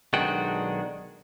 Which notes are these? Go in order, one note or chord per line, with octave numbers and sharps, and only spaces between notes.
B1 D#3 G#3 D4 F#4 G5